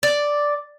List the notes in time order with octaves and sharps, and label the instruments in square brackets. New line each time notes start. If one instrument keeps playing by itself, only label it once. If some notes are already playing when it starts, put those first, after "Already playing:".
[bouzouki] D5